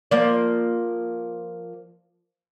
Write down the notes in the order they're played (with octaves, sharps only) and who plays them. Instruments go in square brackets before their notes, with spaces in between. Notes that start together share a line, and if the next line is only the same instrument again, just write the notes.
[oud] F3 A#3 D5